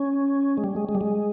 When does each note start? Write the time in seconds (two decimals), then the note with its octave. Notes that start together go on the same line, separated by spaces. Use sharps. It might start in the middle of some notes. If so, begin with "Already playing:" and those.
Already playing: C#4
0.58 G#3
0.64 G3
0.76 G#3
0.89 G#3
0.95 G3
1.01 G#3